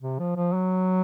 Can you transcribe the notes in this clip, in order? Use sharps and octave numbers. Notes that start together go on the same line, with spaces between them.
C3
F3
F3
F#3